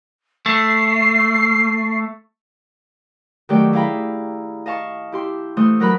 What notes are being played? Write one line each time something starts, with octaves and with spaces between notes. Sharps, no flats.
A3 C7
D#3 F#3 A3 G4 D5 G5
E4 G#4 F5 G5 A#5 B5
D#5 F5 A5 C#6
E4 G4 C6
E3 A3 C5 C6 D#6
F#3 A#4 B4 B5